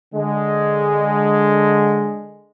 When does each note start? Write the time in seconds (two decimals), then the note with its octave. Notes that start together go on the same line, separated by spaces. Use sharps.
0.13 D3 G#3